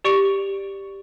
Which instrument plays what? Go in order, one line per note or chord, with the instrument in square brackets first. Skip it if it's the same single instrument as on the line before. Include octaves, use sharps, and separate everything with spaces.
[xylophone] G4 D5 C#6 C#7 D7 F7